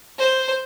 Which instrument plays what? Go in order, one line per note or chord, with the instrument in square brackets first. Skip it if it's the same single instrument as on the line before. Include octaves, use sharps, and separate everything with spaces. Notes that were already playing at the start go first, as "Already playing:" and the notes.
[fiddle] C5